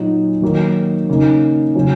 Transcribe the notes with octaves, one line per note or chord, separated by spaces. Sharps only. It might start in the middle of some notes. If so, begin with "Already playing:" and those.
Already playing: A#2 F#3 D#4
D#3 F#3 A#3 D#4
C#3 A#3 D#4
C#3 F#3 C#4